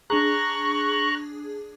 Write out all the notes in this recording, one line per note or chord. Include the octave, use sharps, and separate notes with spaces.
D4 G#4 A#5 C#6 F#6